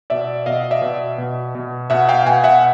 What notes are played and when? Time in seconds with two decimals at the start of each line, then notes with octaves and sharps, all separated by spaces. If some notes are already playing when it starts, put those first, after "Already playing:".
0.10 B2 D5 E5
0.46 B2 D#5 F5
0.71 D5 E5
0.82 B2
1.18 B2
1.55 B2
1.90 B2 E5 F#5
2.09 F5 G5
2.26 B2 F#5 G#5
2.44 E5 F#5